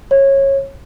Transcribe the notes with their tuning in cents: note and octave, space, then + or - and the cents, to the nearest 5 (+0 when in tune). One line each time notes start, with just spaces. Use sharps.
C#5 -20